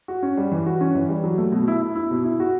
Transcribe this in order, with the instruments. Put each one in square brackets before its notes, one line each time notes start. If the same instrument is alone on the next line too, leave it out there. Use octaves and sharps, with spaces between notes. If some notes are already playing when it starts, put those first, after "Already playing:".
[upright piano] F#4
C#4
G3
E3
F#4
C#4
E3
G3
F#3
A3
B2
E4
E4
E4
B2
E4
F#4